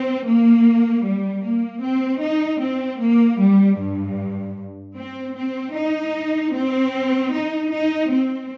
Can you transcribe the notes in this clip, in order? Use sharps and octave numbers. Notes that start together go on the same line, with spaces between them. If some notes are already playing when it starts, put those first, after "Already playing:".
Already playing: C4
A#3
G3
A#3
C4
D#4
C4
A#3
G3
G2
C4
C4
D#4
C4
D#4
D#4
C4